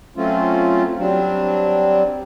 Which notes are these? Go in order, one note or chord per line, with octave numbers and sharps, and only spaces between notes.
F#3 A3 C4 C#4 F4
F#3 G3 C4 D4